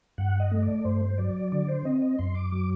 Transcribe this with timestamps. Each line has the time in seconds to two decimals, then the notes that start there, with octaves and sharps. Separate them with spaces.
0.18 G2 F#5
0.40 D#5
0.52 A3
0.62 D5
0.85 G2 C5
1.18 F#3 D5
1.52 D3 D5
1.68 C5
1.85 C4 D#5
2.02 D#5
2.18 F#2 C6
2.35 D6
2.52 F#3 D6